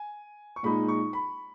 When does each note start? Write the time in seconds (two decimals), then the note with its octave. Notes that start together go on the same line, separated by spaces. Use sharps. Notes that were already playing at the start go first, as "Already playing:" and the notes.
Already playing: G#5
0.56 C#6
0.63 A#2 G#3 D#4 B5
0.88 C#6
1.13 B5